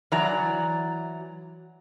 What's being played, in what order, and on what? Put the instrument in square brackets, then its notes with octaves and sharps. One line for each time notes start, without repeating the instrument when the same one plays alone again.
[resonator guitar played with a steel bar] E3 F#3 D5 A#5